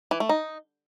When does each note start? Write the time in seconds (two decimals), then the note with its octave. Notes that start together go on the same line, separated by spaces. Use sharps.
0.11 E3
0.20 A3
0.29 D#4